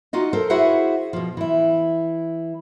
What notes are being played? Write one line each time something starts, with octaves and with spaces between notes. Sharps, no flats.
D#4 F4 F#4 D#5
A4 A#4 C5
E4 F#4 G#4 C5 E5 F#5
B2 F3
E3 E4